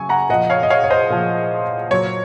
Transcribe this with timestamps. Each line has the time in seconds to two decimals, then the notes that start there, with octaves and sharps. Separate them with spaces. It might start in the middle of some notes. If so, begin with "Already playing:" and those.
Already playing: C#3 F#3 G#5 C#6
0.09 F#5 A#5
0.29 A#2 F3 D#5 F#5
0.50 C#5 F5
0.63 D#5
0.70 C#5 F5
0.84 C#5
0.90 C5 D#5
1.10 A#2 F3
1.91 A#2 F#3 C#5